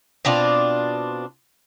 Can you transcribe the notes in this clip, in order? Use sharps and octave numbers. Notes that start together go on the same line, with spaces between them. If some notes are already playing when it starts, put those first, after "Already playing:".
B2 C4 D4 F4